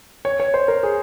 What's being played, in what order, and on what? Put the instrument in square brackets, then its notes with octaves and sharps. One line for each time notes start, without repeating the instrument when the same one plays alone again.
[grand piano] C#5
C#5
C5
A#4
G#4